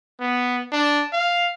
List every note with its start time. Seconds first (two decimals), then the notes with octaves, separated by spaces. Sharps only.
0.20 B3
0.72 D4
1.13 F5